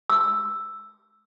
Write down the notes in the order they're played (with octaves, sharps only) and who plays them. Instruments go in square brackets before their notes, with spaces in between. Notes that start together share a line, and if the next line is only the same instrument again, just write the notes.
[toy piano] E6